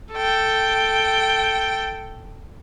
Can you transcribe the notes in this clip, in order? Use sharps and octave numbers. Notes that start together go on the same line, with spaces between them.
A4 G5